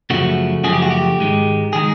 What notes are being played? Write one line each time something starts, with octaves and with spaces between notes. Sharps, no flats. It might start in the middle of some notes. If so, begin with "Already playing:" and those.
F#2 C#3 F3 A3 F#4
F#2 C#3 F3 A3 G#4
G4
F#4
G4
G#2 D#3 G#3
D#3 G#3 G#4